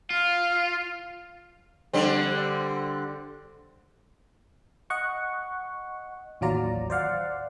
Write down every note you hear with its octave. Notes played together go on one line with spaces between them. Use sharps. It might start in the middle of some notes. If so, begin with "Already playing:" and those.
F4 F5
D3 G3 C4
D#5 F#5 C#6
A1 D#2 F#3 F4 D5 A#5
C5 D5 F5 F#5